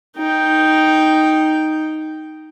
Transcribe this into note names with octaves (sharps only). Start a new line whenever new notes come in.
D#4 G5